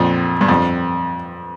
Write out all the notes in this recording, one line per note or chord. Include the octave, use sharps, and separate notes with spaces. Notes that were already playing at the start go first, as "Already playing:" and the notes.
Already playing: F2 A#2
G2
F2